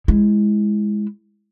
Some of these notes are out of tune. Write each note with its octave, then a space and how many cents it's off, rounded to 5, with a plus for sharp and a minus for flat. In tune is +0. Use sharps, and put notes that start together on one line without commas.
G#3 +0 E4 +0